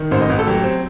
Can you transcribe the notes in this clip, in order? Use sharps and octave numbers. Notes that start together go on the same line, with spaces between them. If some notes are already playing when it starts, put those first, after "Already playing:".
Already playing: D#3
A1 C5
D#5
A1 B4
A4
F#3 G4
C4